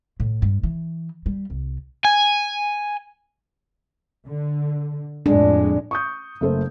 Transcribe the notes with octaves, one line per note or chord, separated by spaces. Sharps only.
A2
G2
E3
G3
C2
G#5
D3
F2 A2 G#3 D4
C#6 D#6 G6
F#1 A3 A4 C5